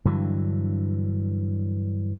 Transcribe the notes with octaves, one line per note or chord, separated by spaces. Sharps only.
G2 D3 E3 F#3